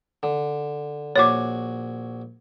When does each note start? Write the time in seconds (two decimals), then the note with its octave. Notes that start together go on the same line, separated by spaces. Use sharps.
0.23 D3
1.16 A#1 F#4 C#5 G#5 D6